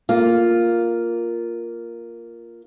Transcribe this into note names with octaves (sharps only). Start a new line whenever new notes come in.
A#3 F4